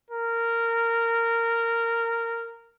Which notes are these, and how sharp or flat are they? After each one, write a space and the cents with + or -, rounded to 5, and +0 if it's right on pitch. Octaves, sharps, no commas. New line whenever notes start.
A#4 -15